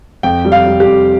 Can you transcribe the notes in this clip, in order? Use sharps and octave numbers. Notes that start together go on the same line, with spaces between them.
F2 G5
G3
F5
G3
G4
F2